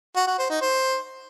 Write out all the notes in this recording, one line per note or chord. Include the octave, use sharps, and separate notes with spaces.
F#4
F#4
C5
D#4
C5